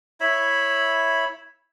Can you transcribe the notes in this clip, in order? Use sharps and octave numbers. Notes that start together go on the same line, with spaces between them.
E4 C#5 E5 B5